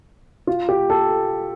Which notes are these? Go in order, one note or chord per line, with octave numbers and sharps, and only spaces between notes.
F4
G4
A4